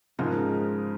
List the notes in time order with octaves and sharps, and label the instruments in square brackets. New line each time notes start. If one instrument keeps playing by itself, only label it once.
[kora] G#2 [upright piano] C#3 F3 G#3 D#4 A#4